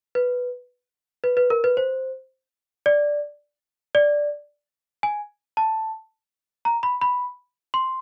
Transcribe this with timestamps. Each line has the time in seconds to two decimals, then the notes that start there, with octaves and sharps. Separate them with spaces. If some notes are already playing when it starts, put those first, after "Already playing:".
0.15 B4
1.24 B4
1.37 B4
1.50 A#4
1.64 B4
1.77 C5
2.86 D5
3.95 D5
5.03 G#5
5.57 A5
6.65 A#5
6.83 B5
7.01 B5
7.74 C6